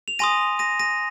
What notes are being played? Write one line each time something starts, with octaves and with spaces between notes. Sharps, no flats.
F7
G#5 C6 D#6 A#6 D#7
A#6 D#7
A#6 D#7